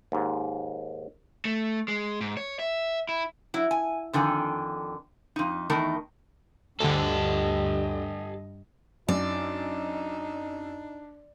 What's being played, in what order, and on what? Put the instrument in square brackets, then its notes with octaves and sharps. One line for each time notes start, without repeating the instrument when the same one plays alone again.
[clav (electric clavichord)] D#2 G#2
[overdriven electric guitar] A3
G#3
G#2
C#5
E5
E4
[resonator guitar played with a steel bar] F#3 E4
G#5
F2 D3 D#3 G#5
F2 D#4
E2 D#3 A3 D#4 A#4
[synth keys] D2 D3 [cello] G2 D#5 [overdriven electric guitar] G4 A4
[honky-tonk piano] F#2 [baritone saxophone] D4 [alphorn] D#4 [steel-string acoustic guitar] D5